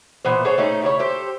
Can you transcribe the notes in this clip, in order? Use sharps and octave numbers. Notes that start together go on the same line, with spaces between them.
A#2 E3 B3 C5
G#4 A4 C5 C#5
A3 C#4 D#4 G#4
C#3 E4 G#4 C#5
G4 A4 C5